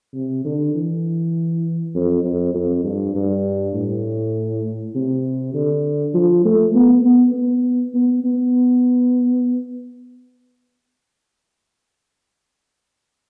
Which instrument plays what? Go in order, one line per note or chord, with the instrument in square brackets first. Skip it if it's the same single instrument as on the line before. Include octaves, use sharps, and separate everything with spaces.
[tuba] C3
D3
E3
F2
F2
F2
G2
G2
A2
C3
D3
F3
A3
B3
B3
B3
B3
B3